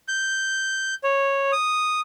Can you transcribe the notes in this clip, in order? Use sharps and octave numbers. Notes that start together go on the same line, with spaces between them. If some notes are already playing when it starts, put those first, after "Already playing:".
G6
C#5
D#6